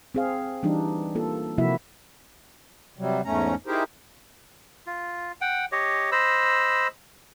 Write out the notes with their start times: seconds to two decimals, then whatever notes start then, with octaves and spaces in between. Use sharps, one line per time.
0.15 C4 G#4 F5
0.63 E3 G3 D4 D#4
1.15 A#3 F4 A4
1.58 C3 F3 A#3 E4 F#4 E5
2.98 C3 F#3 G3
3.25 E2 G#2 A3 C#4 A#5
3.67 D#4 E4 G4 G#4 A#4 C5
4.87 F4
5.41 F#5 G5
5.72 G4 C#5 D#5
6.12 C5 D#5 B5 E6